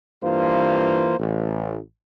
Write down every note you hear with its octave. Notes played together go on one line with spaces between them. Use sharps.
G2 E3 A#3 F4 C5
A1